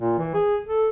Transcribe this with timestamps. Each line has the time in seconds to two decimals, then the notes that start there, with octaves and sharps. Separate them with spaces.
0.01 A#2
0.18 E3
0.34 G#4
0.65 A4